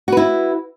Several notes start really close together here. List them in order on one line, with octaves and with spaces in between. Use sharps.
F#4 B4 E4